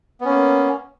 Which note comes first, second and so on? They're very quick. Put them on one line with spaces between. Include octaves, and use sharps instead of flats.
B3 C#4 A#3